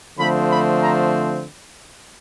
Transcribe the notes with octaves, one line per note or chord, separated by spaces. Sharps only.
D3 F3 A3 C4 B5
B5
A#5